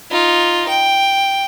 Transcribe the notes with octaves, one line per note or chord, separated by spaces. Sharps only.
D#4 F4
G5